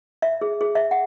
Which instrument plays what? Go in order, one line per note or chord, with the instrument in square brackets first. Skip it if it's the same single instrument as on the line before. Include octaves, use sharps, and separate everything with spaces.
[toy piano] E5
G#4
G#4
E5
F#5